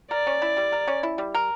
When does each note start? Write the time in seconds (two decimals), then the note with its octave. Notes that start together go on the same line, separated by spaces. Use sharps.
0.11 A#4 D5
0.27 C#4
0.42 E4
0.57 G3
0.72 A#4
0.88 C#4
1.03 E4
1.18 G3
1.34 A#4